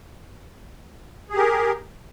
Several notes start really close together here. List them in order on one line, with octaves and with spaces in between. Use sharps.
G#4 G4 A#4